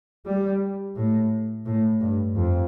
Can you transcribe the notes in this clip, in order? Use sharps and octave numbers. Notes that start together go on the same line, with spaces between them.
G3
A2
A2
G2
F2